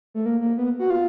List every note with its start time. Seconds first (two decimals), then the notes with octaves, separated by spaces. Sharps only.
0.14 A3
0.26 A#3
0.41 A#3
0.58 B3
0.79 F#4
0.90 F4